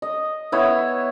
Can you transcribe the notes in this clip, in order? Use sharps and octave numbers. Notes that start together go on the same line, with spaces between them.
D#5
B3 E4 C#5